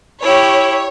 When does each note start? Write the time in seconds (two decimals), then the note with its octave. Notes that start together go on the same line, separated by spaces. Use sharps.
0.23 E4 G4 C#5